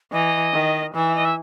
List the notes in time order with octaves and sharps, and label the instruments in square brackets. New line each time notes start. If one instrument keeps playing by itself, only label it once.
[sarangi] E3 [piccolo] D#5
[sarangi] D#3
[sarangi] E3 [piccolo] E5
[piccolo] D#5
E5